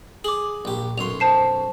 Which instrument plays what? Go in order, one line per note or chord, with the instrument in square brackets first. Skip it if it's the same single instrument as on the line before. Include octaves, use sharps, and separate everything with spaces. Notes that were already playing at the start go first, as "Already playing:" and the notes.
[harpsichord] G#4 [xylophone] D6 F#7
[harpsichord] A#1 G4
[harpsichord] B1 F#2 C6 [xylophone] F7
[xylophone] C5 A5 C7